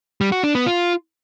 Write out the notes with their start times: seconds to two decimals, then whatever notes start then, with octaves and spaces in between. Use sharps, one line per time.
0.21 G3
0.32 F#4
0.44 D4
0.55 B3
0.66 F4